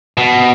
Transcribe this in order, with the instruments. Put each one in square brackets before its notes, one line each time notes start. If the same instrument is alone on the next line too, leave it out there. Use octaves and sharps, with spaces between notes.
[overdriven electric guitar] B2